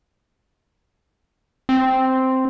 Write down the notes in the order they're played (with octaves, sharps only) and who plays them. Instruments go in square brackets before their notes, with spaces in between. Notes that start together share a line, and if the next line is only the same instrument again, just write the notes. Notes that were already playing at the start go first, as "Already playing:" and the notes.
[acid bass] C4